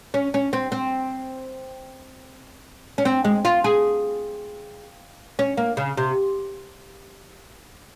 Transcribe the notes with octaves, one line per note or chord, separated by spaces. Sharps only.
C#4
C#4
C4
C4
C#4
C4
G#3
F4
G#4
C#4
A#3
C#3
C3